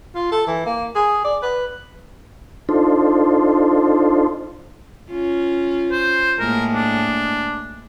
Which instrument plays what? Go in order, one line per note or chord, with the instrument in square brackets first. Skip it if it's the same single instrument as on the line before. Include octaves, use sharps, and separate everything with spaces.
[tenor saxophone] F4
A4
E3
A#3
G#4
D5
B4
[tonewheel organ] D4 D#4 F4 A4 C5
[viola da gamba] C#4 F4
[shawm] C5
[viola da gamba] A2 G#3 A#3 [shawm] A#4
[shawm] D4